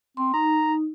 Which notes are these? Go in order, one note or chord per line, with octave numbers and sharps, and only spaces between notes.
C4 C6
D#4 A#5